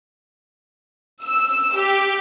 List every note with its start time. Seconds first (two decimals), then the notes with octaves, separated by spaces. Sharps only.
1.22 E6
1.76 G4